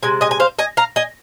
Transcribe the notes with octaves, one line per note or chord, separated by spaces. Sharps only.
C3 G#3 G#5
D#5 G#5
G#5
C5 F5
D#5 G#5
F5 A#5
D#5 G#5